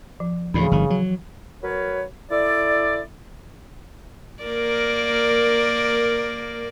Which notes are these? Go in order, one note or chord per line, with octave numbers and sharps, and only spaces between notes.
F3
D2 A2 C#3 E3 F3 B5
G1 D#3
F#3
F#3 A#4 B4 C#5
E4 A4 D5
A#3 A#4 D5